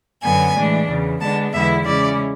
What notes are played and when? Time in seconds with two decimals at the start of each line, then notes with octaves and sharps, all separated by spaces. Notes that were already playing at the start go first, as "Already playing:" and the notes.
0.22 F#2 D3 F#3 B3 G#5
0.55 A2 E3 G#3 D4
0.88 E2 C#3 E3
1.20 D3 G#3 B3 D4 A5
1.53 E2 D3 G#3 B3 E4 E5
1.85 C#3 G#3 C#4 E4 D5